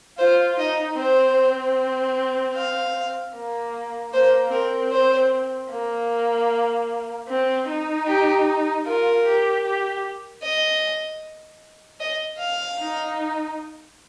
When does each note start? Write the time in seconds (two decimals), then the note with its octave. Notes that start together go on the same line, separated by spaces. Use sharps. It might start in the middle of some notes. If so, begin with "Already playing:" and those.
0.19 F4 C5
0.59 D#4 D#5
0.98 C4 C5
2.56 F5
3.34 A#3
4.14 A#3 C5
4.52 C4 A#4
4.92 C5
5.70 A#3
7.28 C4
7.68 D#4
8.07 G4
8.85 F4 A#4
9.25 G4
9.65 G4
10.43 D#5
12.00 D#5
12.39 F5
12.79 D#4